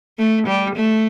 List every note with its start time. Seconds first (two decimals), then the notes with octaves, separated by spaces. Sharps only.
0.18 A3
0.47 G3
0.75 A3